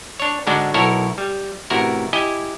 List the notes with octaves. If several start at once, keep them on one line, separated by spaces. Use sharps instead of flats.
D4 C#5
G#2 D3 G#3 D4 F#4
B1 E4 F#4 A4 A#4 C#5
G3
A1 C3 E4 F#4 A#4
E4 G4 D#5 G#5